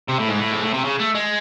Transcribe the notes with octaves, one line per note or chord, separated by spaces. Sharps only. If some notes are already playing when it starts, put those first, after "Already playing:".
C3
A2
G#2
A2
G#2
A2
C3
C#3
A3
G#3